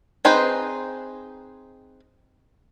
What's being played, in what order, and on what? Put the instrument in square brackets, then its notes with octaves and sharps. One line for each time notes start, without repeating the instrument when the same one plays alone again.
[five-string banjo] C4 D#4 G#4 B4 C5